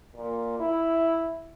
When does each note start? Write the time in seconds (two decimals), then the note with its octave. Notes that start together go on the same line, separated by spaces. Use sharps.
0.16 A#2
0.60 E4